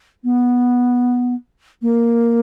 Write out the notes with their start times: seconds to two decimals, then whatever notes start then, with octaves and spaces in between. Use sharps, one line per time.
0.24 B3
1.82 A#3